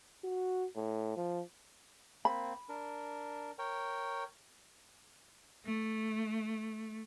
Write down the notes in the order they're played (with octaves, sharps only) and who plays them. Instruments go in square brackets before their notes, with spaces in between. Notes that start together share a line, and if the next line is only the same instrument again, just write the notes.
[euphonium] F#4
A2
F3
[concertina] A#3 C4 [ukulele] B5
[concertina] D4 A#4
A#4 C#5 G5
[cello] A3